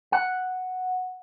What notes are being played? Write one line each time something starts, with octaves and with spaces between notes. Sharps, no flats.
F#5